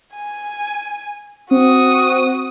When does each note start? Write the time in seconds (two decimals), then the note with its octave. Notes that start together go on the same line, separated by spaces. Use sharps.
0.15 G#5
1.51 C4 F#4 D#6